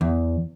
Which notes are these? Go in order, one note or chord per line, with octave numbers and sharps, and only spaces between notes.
E2